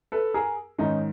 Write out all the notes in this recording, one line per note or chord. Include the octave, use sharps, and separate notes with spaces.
A4 B4
G#4 A#4
G#2 D#3 C#4 D#4